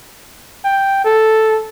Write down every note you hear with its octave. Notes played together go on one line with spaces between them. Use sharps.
G5
A4